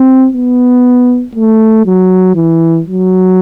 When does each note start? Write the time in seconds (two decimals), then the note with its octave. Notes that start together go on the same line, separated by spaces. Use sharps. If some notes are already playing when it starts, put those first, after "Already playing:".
Already playing: C4
0.34 B3
1.35 A3
1.86 F#3
2.35 E3
2.86 F#3